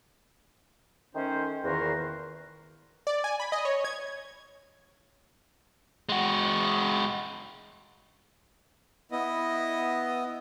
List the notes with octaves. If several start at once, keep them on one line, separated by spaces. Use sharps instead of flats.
D#3 A3 C#4 C5
E2 A#2 D#3 F#4 A#4 C5
D5
G#5
B5
D#5
C#5
G#6
G#3 F#4
B3 E4 D#5